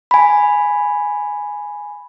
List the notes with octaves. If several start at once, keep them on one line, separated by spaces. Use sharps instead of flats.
G#5 B5